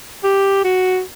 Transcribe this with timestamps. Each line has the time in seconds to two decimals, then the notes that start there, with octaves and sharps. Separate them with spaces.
0.23 G4
0.64 F#4